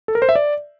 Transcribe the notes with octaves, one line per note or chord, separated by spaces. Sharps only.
A4
A#4
C5
E5
D5